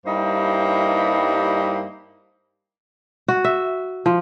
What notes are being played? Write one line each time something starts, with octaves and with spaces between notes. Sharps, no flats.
G2 G3 A#3 D#4 E4 C5
F#4
E5
F3